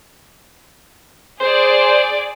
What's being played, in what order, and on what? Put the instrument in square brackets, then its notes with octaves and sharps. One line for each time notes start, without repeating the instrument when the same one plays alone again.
[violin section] G#4 D5 [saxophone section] C5